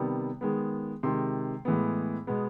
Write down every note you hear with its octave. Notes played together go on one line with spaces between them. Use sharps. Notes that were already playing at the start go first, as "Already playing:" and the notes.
Already playing: C3 D#3 G3 B3
D#3 G#3 B3
C3 D#3 G#3 C6
A2 E3 G#3 B3
B2 G#3 B3